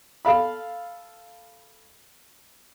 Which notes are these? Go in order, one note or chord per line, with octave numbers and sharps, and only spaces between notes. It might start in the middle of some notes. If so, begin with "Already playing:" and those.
A4 F5 B5